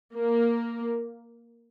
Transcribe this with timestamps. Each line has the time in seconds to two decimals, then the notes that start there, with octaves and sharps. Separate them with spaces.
0.14 A#3